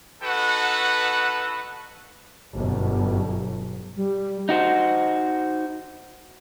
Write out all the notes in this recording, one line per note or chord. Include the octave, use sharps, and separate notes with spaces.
D#4 F#4 A4 B4 F#5
G1 F#2 B2
G3
D#4 F#4 C5